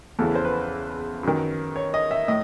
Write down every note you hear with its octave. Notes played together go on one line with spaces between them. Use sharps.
E2 C#3 E3 A4
C5
B4
F#2 D#3
C#5
D#5
E5
A2 D#5